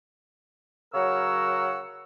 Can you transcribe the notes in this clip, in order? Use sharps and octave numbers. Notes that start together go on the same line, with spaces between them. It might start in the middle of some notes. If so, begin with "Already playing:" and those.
C#3 F#3 A#4 C#5 F#5 E6